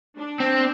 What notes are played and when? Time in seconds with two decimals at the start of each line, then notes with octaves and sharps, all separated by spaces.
0.18 D4
0.40 C4